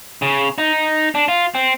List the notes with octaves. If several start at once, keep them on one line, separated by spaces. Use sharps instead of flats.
C#3
D#4
D4
F4
C4